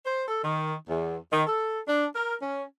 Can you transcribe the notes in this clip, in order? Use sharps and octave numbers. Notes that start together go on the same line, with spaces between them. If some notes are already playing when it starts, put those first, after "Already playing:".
C5
A4
D#3
E2
D#3
A4
D4
A#4
C#4